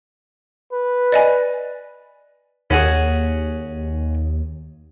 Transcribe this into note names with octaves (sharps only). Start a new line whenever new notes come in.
B4
D5 D#5 G#5
D#2 C#4 F#4 G#4